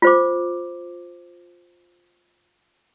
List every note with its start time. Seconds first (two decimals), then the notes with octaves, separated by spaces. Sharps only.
0.02 F4 C5 D6